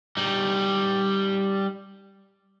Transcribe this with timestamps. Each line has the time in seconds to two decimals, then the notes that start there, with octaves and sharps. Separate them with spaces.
0.17 G3 D#4